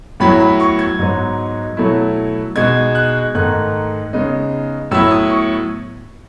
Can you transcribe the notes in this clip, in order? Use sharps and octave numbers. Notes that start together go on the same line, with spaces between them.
A2 F#3 B3 E4 B5
B5
C#6
G#6
G#2 F#3 B3 D#4
B2 F#3 A3 E4
B2 G#3 D#4 G#6
F#6
G#2 D#3 A3 D#4 F#6
C#3 G#3 B3 D#4
A2 F#3 B3 E4 E6
D#6
C#6